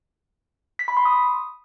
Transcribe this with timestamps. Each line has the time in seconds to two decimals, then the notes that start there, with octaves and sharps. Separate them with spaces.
0.79 B6
0.88 B5
0.97 C6
1.05 D#6